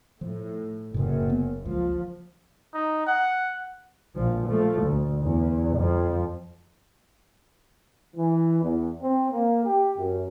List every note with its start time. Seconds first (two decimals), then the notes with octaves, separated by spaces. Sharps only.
0.21 A2 F3
0.94 F#1 F#2 A2 C3
1.30 B3
1.65 C#2 F3
2.74 D#4
3.07 F#5
4.15 A#1 F3
4.46 F3 A3
4.82 D2
5.22 E2
5.77 F2 F3
8.16 E3
8.61 E2
9.01 C4
9.31 A#3
9.64 G4
9.97 F#2